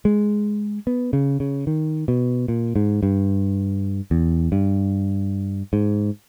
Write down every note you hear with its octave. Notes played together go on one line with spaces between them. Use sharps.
G#3
B3
C#3
C#3
D#3
B2
A#2
G#2
G2
E2
G2
G#2